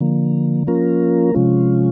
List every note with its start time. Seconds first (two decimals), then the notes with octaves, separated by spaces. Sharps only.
0.01 D3 F3 A#3
0.67 F3 A#3 C#4 F4 A#4
1.34 C3 F3 G#3 C#4 F4